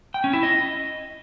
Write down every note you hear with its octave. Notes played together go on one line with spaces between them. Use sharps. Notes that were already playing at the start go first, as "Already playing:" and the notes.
G5
C#4
E4
D#5